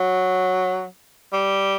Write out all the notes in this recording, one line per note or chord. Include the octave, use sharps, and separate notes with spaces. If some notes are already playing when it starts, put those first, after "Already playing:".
Already playing: F#3
G3